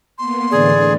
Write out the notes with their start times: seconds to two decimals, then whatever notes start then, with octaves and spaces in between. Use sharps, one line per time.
0.18 A#3 B3 C6
0.51 A2 D3 E3 G#4 D5